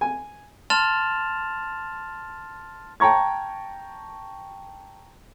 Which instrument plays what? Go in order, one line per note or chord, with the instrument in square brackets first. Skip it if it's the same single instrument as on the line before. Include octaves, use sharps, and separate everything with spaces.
[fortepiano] G#5
[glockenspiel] A5 C6 F6 A6 E7 F7
[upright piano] G5 A5 A#5 C#6 G#6